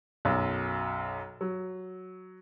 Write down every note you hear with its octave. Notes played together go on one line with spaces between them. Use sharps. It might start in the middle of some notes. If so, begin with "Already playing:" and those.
B1 F#2
F#3